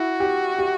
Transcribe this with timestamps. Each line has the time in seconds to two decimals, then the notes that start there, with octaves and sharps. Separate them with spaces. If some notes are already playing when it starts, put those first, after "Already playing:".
Already playing: E4 F#4
0.20 G4
0.59 G4